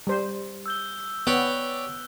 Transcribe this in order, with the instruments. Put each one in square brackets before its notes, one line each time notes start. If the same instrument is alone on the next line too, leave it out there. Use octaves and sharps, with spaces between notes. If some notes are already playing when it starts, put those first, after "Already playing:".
[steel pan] G3 C5
[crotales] E6 G6 G7
[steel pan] B3 [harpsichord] G4 C#5 D5 [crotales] E6 F#6 G7